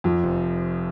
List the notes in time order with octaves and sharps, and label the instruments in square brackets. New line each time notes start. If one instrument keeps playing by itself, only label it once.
[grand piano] F2 [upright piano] F3
[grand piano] F1